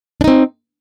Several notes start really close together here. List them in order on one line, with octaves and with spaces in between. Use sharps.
D4 D#4 C4